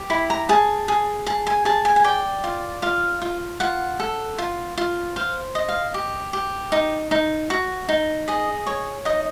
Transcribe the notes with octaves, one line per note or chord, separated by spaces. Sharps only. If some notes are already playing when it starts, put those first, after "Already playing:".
Already playing: G4
E4 B5
A#5
G#4 A5
G#4
G#4 A5
G#5
G#4 A5
G#5
G#5
D5 G5
F4
F4 F5
F4
F4 F#5
A4
F4
F4
C5 F5
D#5
F5
G4
G4
D#4
D#4
F#4
D#4
G#4 D#5
C#5
D#4 D#5